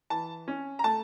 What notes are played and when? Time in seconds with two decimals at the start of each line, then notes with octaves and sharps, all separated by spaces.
0.10 E3 A5
0.48 C#4
0.79 A#5
0.84 A3 A5